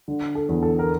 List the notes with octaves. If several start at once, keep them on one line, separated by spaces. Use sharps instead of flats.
D3
A4
E2
A4
A#4